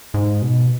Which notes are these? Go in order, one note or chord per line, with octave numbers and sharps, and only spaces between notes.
G#2
B2